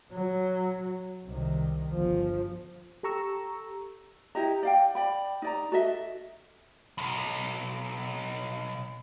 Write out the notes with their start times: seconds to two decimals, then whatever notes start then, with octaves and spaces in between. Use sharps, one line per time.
0.12 F#3
1.26 C2 D#3
1.92 G1 F3
3.03 G4 A4 A#5 C#6 E6
4.35 E4 G4 D#5 A#5
4.63 D5 F5 G5
4.95 D5 G5 B5
5.42 D#4 D5 A#5
5.72 F#4 A4 D#5 E5
6.98 B1 F2